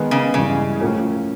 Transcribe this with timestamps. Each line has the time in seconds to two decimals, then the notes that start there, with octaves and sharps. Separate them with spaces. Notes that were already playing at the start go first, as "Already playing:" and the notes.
Already playing: D#3 G#3 B3
0.11 C#3
0.34 G2 C#3 E3 G#3
0.80 A2 F3 A#3 C#4